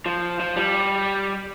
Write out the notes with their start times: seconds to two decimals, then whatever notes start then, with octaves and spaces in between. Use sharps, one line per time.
0.06 F3
0.40 F3
0.56 G3